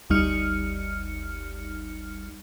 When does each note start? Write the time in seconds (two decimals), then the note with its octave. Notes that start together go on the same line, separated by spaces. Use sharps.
0.10 G1 D2 G3 D#4 F6 C#7